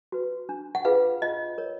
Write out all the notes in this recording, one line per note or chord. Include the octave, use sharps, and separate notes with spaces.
F#4 B4
D4
F#5
F4 G#4 B4 F5
F4 D#5
A#4 C#5